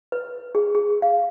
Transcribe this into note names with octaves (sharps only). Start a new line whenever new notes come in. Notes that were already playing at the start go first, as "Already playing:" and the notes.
B4
G#4
G#4
F5